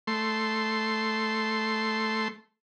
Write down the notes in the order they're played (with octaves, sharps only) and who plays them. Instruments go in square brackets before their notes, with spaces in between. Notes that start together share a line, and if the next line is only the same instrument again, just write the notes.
[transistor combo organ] A3 C6